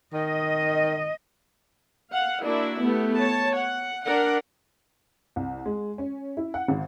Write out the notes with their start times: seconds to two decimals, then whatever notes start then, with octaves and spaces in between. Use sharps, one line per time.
0.13 D#3 D#5
2.12 F5 F#5
2.44 A#3 D4 E4 F#4
2.81 A3 B3 G4
3.17 C#5 A5
3.57 F#5
4.06 D4 A#4 D5 F#5
5.36 C2
5.66 G#3
5.98 C#4
6.37 E4
6.54 F#5
6.68 G#1